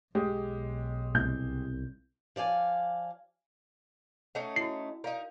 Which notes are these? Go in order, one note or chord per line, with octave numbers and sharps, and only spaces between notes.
B1 G#3 G4
C2 G6
F3 D5 F5 G#5
A3 C#4 D#4 F#5
E4 F#4 C7
D#4 A#4 D5 F5